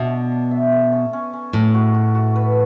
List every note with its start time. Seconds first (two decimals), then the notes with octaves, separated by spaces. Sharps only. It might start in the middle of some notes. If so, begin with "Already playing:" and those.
Already playing: B2 D4 E5
0.11 F#4
0.32 D4
0.51 E5
0.72 A4
0.92 C#4
1.13 C#4
1.33 C#4
1.53 A2 C#4
1.74 F#4
1.94 F#4
2.15 F#4
2.36 B4